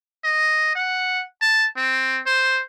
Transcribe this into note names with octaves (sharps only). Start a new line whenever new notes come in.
D#5
F#5
A5
C4
C5